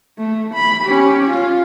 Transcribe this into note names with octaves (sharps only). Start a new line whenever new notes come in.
A3
B5
C#4 G4
F4